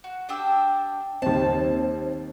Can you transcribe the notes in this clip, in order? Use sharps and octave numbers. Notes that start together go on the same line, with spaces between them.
F#4
D4 G4 E6
D#2 C4 A5